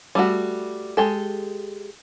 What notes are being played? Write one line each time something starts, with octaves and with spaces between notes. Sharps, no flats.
G3 A3 F#4
G#3 G4 A4